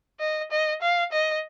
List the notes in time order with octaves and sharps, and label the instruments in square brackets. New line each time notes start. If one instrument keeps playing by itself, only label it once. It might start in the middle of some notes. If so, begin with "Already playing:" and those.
[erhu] D#5
D#5
F5
D#5